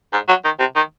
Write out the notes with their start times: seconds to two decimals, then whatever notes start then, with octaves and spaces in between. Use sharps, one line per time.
0.13 G#2
0.29 F#3
0.45 D#3
0.59 C3
0.76 D#3